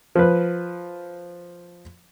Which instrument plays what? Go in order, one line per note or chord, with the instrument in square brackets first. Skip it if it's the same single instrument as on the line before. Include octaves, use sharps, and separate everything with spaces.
[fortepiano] F3 B4